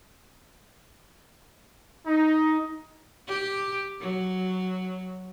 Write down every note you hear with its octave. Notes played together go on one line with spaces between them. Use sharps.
D#4
G4
F#3